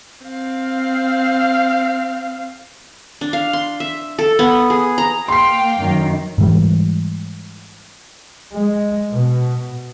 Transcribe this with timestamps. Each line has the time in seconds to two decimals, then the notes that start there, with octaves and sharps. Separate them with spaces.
0.25 C4 F5
3.21 D4
3.33 F5
3.53 C6
3.80 E5
4.19 A4
4.39 B3
4.70 G#4
4.98 A#5
5.28 A#3 F5 G5 C6 C7
5.79 F#2 D#3
6.38 G#2 E3 G3
8.52 G#3
9.12 B2